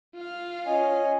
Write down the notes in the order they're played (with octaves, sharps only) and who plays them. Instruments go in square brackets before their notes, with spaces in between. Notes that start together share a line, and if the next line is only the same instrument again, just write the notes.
[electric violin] F4 F5
[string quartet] C#4 [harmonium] D#5 G#5